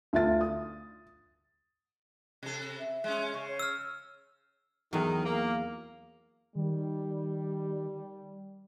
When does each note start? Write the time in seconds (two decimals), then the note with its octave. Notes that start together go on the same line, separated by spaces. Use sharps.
0.13 D2 F4 E5 A6
0.41 D#6
2.43 C3 A4
2.79 E5
3.04 G#3 C#4
3.34 C#3 C#6
3.48 C#5
3.59 E6 F6
4.93 E2 D#3 F#3
5.25 A#3
6.55 D#3 G3